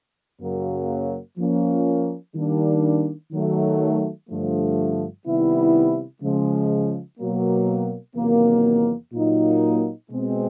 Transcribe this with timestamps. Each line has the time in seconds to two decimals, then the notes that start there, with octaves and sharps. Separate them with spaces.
0.41 F#2 C#3 F#3 A#3
1.38 F3 A#3 C#4
2.35 D#3 G3 A#3 D4
3.32 D#3 F#3 A3
4.29 G2 D3 F3 A3
5.26 C3 D#3 G3 B3 E4
6.22 C#3 F3 G#3
7.20 B2 F#3 A#3
8.16 E2 C3 D#3 F#3 A#3
9.13 A#2 F#3 A#3 D#4
10.10 B2 G#3 C4